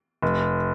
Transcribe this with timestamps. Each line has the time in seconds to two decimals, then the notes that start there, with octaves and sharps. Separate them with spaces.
0.22 F1